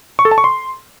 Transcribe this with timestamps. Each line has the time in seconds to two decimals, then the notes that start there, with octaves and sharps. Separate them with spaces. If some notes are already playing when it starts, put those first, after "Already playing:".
0.19 C#6
0.25 A4
0.31 A5
0.38 C#6
0.44 C6